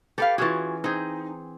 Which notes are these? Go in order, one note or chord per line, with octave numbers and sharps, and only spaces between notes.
G4 A4 B4 D5 F5
E3 C#4 F4 F#4 G#4
C4 D#4 G#4